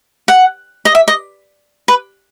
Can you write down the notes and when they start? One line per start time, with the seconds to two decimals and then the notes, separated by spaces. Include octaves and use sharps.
0.28 F#5
0.85 D#5
0.95 E5
1.08 D#5
1.88 B4